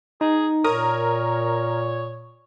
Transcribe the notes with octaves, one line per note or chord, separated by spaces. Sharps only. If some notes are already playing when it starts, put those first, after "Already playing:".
D#4 G#4
A#2 A#4 C#5 D#6